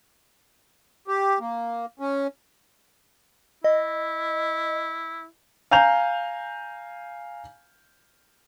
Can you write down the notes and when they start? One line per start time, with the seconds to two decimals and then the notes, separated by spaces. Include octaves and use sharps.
1.08 G4
1.40 A#3
1.99 C#4
3.64 E4 D#5
5.71 F5 G#5 A#5 G6 F7